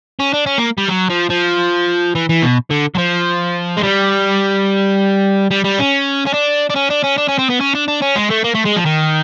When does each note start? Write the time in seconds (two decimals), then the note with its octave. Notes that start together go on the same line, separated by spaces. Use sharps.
0.19 C#4
0.33 D4
0.46 C#4
0.58 A#3
0.78 G3
0.89 F#3
1.10 F3
1.30 F3
2.15 E3
2.29 E3
2.42 B2
2.70 D3
2.95 F#3
2.98 F3
3.77 G#3
3.83 G3
5.51 G3
5.64 G3
5.79 C#4
6.27 C#4
6.34 D4
6.70 D4
6.76 C#4
6.91 D4
7.04 C#4
7.18 D4
7.29 C#4
7.39 C4
7.50 B3
7.61 C#4
7.75 D4
7.88 D4
8.02 C#4
8.16 G#3
8.31 A3
8.45 A#3
8.55 A3
8.66 G#3
8.77 F3
8.86 D#3